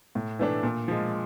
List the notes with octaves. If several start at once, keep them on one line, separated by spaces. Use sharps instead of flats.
A2
E3 A3 D4
A#2
F3 G#3